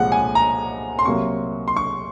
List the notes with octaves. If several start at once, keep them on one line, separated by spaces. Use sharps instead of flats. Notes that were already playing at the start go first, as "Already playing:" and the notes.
Already playing: C2 A#2 F3 G#3 F#5
G#5
A#5
C6
C2 C3 F#3 A#3 C#6
C6
C#6